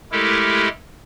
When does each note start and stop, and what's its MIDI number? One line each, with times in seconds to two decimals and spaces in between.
0.12 0.68 56
0.12 0.68 57
0.12 0.68 64
0.12 0.68 67
0.12 0.68 69
0.12 0.68 70